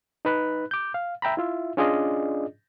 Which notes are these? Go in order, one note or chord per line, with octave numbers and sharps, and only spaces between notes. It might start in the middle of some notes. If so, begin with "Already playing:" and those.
D#4 B4 B5 F#6
D6 G6
F5
E5 G5 A#5 B5
E4 F4 E5
C#4 D4 F4 G#4 D5 D#5